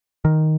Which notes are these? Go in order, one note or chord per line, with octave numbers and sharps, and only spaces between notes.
D#3